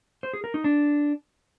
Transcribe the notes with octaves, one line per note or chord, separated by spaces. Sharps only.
C5
G#4
A#4
D#4
D4